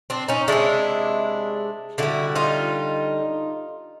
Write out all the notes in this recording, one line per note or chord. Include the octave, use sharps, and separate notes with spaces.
C4 D4
C#4 D#4
C3 D#3 G#3 D4 E4
D3 G3 E4 F#4
D#4 F4